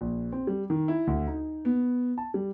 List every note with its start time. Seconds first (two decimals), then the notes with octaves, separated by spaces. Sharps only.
0.01 A#1
0.32 C4
0.47 G3
0.70 D#3
0.88 E4
1.07 D2
1.27 D#4
1.65 B3
2.18 A5
2.34 G3